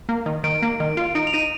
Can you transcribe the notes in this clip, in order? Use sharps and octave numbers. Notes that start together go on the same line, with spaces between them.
A#3
D#3
D#3 D7
A#3
D#3
F4
D#4 D7
F7
D#4 D#7